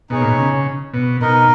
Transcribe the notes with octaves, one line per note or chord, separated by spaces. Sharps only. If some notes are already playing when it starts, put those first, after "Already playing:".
B2 D#4 G#4 C#5
A#2
B2
C#3
B2
B2 D#4 A#4 D#5